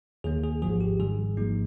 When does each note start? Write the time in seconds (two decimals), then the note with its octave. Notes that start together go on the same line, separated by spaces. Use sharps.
0.24 D#2 D#3 A#3 G#4
0.43 G#4
0.62 G#1 G#2 F3 G#4
0.81 G4
1.00 G#2 D#3 G3 G#4
1.37 G#1 G#2 F3 A#3 D#4